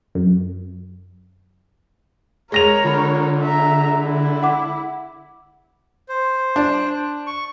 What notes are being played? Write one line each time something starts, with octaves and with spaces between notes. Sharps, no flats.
F#2
G#3 A#4 C#5 A#6 F7
D3 F4 B5
E5 A#5
E4
F#5 D6
C5
D4
C#6